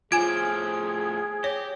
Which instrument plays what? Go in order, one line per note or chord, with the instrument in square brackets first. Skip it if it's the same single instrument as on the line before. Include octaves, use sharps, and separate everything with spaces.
[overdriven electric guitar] A2 F3 [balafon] F4 G#5 [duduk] G#4 [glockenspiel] G#6 D7
[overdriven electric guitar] G4 [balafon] C#5